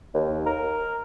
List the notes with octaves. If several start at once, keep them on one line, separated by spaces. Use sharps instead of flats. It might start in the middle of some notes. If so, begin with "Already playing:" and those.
D#2
A#4